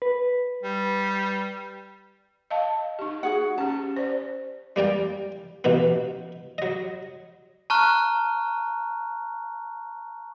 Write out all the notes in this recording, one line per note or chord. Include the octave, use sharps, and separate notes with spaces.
B4
G3
D#5 F5 A5
D#4 G4
F#4 G#4 F#5
C#4 G4 A5
C5 D5
G3 A#3 D5 G5
A1 B2 A#3 B3
F#3 D#5
A5 A#5 C#6 F6 F#6